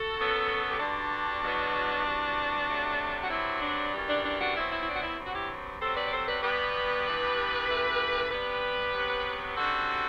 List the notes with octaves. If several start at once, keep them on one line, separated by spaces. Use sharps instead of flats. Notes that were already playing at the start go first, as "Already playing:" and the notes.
Already playing: F#4 A4
F#2 F#3 B3
G4
G2 D3 G3 D4 F#4
E2 B2 F#3 B3
C3 E3 G3
C3 F#3 A3
F#4
G2 F#3 C4 E4
D4
F#2 E3 G3
D4
D4
D4 F#4
B2 F#3 C4 E4
E4
E4
D4
F#4
E4
G2 F#3 C4
F#4
E4 G4
C3 F#3 C4 A4 C5
B4 D5
D5
A4 C5
B4 D5
B2 G3 B3 G4 B4
G2 E3 B3
F#2 E3 A3
C3 G3 B3 G4 B4
C3 F#3 B3
F#2 D3 G3 C4 F#4 A4